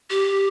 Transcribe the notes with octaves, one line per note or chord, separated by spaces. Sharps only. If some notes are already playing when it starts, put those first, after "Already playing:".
G4